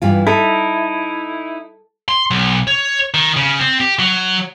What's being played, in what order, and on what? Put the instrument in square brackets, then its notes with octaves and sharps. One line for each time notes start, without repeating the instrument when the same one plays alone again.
[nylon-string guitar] G2 E3 F4
[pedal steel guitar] D#4 E4 [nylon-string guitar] A4
[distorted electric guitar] C6
B1
C#5
D#3
C#3
C4
G4
F#3